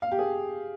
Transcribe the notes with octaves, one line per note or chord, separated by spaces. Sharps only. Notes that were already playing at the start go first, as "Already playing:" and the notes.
F5
G4
G#4